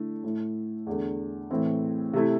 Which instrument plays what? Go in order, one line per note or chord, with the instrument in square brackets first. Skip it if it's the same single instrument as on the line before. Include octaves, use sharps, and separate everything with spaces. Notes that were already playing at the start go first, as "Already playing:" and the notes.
Already playing: [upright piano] D3 A3 E4
A2 A3 E4
E2 D3 A3
A2 E3 C4
C3 A3 E4